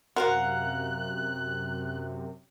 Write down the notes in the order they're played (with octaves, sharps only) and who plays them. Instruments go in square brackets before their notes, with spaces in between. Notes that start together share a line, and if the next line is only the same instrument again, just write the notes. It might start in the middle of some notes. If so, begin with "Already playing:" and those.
[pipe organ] F#2 C3 [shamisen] F#4 C5 [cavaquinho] A#4 F5 F#5 [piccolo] F#6